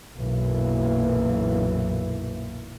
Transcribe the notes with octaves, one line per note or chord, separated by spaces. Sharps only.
B1 F#2 A#2 E3 A#3